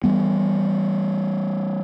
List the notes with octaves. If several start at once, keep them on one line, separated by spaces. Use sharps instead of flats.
E3 G3 B3